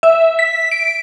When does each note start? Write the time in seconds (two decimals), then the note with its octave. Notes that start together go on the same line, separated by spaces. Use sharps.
0.03 E5
0.39 B6
0.71 D7